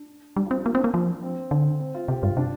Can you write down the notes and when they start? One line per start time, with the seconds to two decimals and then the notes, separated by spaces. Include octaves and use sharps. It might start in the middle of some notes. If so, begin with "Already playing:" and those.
Already playing: D4
0.36 G3 D4
0.46 F4
0.51 C4
0.56 G4
0.65 A#3 F4
0.75 C4
0.79 A#3 D4
0.94 F3
1.23 C4
1.51 D3
1.80 C4
1.94 F4
2.08 C3 G4
2.23 G2 F4
2.37 C3 D4